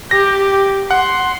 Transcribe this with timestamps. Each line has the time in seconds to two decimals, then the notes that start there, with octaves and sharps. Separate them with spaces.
0.11 G4 A#6
0.91 F#5 C6